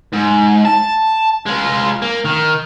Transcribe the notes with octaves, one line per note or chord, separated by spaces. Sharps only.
G#2
A5
G#3 F4
A#3
D#3